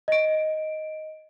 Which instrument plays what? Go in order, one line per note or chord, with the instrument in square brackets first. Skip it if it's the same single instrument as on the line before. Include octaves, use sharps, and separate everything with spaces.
[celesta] D#5 D7